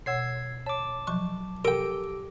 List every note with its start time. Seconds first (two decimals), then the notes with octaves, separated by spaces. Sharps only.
0.06 B2 C#5 F#5 E6 G#6 C7
0.66 C#5 A5 D6
1.07 F3 F#3 C#6
1.65 G4 A4 A#4 G5 D7